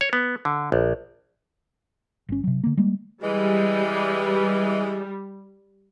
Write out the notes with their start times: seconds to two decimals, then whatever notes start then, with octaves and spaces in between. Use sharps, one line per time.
0.01 C#5
0.13 B3
0.45 D3
0.72 A#1
2.29 G1 C#4
2.44 C3 F#3
2.64 D3 A#3
2.77 G3 G#3 A#3
3.22 E3 G3 G#3